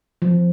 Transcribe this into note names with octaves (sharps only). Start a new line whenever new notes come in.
F3